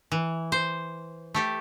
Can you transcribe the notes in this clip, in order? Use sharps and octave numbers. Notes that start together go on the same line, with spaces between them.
E3
C5
A3 G4 A4